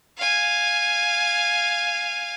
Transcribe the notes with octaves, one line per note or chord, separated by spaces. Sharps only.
F5 G#5